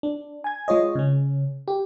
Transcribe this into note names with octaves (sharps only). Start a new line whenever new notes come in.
D4
G#5 G#6
G#3 F4 C#5 D#5
C#3 C#4
G4